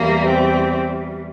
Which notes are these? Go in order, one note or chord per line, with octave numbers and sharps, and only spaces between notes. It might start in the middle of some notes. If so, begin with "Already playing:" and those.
Already playing: E2 E3 G3 A#3
C4